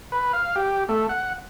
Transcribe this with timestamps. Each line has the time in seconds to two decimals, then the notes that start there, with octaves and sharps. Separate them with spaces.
0.12 B4
0.33 F5
0.56 G4
0.89 A3
1.09 F#5